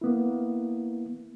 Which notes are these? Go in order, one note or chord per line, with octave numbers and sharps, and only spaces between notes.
A#3 B3 E4